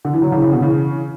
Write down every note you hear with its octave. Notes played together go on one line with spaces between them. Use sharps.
D3
E3
D3 F#3
C#3 E3
C#3 E3
B2 D3
C#3 E3